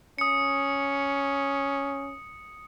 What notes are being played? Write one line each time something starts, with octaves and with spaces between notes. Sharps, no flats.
C#4 D#6 C#7